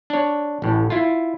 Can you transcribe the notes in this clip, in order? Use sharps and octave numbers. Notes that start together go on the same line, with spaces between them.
D4 C#5
A1 A2
E4 F4